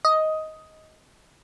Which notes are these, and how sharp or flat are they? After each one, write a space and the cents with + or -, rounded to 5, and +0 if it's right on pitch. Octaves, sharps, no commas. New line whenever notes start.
D#5 +10